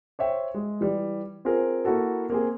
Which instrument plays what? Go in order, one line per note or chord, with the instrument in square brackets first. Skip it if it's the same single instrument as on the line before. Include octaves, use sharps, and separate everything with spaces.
[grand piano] C5 C#5 E5 G5
G#3
E3 G3
C4 F4 G#4 A#4 C5
A#3 E4 F#4 A4
A#3 C4 G#4